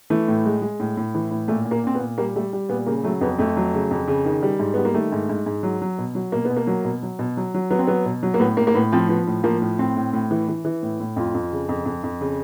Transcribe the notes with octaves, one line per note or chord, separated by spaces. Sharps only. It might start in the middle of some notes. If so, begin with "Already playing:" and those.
E3 A3
A2
G#3
G#3
A2
A2
E3
A2
A#2 A3
A#2
A#3
A#2 C4
B3
A#2
G3 A#3
G3 A3
G3
A#2 B3
C#3 A#3
F#3 A3
F2 B3
F2 A3
F#3
C#3
F2
C#3
D#3
G3
G#2
G3 B3
A#3
D#3 A3
G#2
G#2
G#2
F#3
F#3
B2
F#3
B2 A#3
B3
B2
A#3
F#3
B2
F#3
B2
F#3
F#3
F#3 B3
C4
F#3 B3
B2
F#3
A#3
A2 B3
A2 A#3
A#3
A2 B3
F3 C4
F3 B3
A2
F3 A#3
A2
A2 C4
A2
A2
E3
E3
E3
A2
A2
F2 F4
F2
C#3
F2
F2
F2
C#3